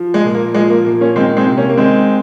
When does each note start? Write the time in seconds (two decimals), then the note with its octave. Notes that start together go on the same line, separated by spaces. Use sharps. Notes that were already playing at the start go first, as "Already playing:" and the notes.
Already playing: F3
0.14 G#3
0.25 A#2
0.34 A#3
0.55 F3 G#3
0.70 A#3
0.85 A#2 A#3
1.01 A#3 C#4
1.16 D#3 G#3 C4
1.37 G#3 C4
1.46 C3
1.57 A#3 C#4
1.69 A#3
1.77 D#3 G#3 C4